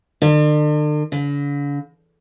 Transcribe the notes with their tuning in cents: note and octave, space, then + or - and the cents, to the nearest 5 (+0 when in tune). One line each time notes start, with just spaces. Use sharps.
D3 +40
D3 -45